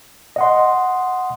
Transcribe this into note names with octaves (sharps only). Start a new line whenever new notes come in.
D#5 F#5 C6